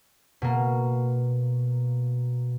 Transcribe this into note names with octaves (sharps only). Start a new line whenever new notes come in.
B2 A#3